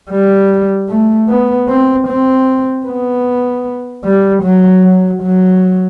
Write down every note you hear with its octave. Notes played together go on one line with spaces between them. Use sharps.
G3
A3
B3
C4
C4
B3
G3
F#3
F#3
F#3